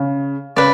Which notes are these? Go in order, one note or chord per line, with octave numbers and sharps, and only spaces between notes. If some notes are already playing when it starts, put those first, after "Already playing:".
Already playing: C#3
C#3 B4 D5